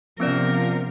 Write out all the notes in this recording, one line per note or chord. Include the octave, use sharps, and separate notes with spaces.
C3 F3 B3 C#4 A#4 D5